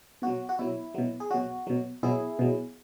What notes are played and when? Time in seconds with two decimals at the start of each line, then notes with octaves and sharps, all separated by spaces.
0.22 B2 F#3 F#4
0.49 F#4
0.59 B2 F#3 E4
0.94 B2 F#3
1.20 G#4
1.31 B2 F#3 F#4
1.67 B2 F#3
2.03 B2 F#3 E4 G#4
2.39 B2 F#3